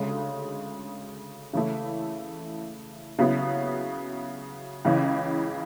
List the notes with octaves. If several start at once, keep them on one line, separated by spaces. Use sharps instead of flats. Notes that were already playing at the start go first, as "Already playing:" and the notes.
Already playing: D2 C#3 G#3
C#3 E3 A3 E4
C#3 F#3 B3 E4
C#2 C#3 E3